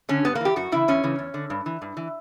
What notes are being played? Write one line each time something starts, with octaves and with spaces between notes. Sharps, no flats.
D3 C#4
G2 B3
A#3
E3 G4
F#2 F#4
C#3 E3 E4
E2 C#4
C#3 E3
E2
D3
G2
E3
G2
E3